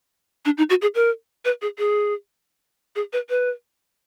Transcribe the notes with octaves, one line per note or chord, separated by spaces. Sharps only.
D4
D#4
F#4
G#4
A#4
B4
G#4
G#4
G#4
B4
B4